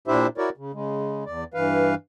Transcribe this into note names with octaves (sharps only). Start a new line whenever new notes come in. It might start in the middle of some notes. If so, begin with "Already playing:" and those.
A#2 D4 E4 G4 C5 E5
E4 F#4 A#4 C#5 D5
C#3
C#3 G#3
E2 D5
G2 E3 B4 F5